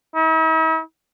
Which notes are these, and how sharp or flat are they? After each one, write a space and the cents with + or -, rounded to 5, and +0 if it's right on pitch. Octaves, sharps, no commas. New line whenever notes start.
E4 -45